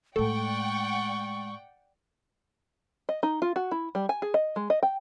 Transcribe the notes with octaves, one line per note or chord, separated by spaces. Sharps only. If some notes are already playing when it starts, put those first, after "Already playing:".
A2 G#3 A4 D5 F#5 G5 C#6
D#5
D#4
F4
F#4
E4
G3
G#5
G#4
D#5
G#3
D#5
G5